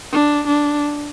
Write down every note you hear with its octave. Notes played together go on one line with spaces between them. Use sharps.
D4
D4